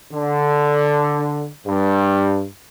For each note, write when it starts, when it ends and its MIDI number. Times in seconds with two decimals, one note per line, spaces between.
0.12 1.47 50
1.66 2.45 43